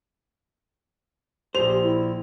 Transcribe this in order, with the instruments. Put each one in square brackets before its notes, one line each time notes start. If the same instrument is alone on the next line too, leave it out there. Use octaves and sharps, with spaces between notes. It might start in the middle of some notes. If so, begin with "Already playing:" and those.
[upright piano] A#1 F7 [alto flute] G4 [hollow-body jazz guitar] C5
[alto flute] E4